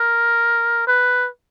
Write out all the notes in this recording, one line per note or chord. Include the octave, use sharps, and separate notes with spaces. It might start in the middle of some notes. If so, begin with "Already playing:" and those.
Already playing: A#4
B4